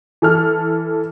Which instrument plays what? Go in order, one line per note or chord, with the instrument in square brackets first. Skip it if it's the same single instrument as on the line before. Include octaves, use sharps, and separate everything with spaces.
[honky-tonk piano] E3 A4 F6